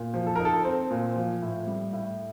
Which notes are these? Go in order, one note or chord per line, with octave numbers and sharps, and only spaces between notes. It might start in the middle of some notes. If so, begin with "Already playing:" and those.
Already playing: A#2
F3
A4
D#4 A#4
A4
C4
A#2
F3
A2
G3
A2